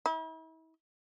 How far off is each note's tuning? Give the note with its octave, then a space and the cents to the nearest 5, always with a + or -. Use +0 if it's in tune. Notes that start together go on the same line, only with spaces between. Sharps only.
E4 -40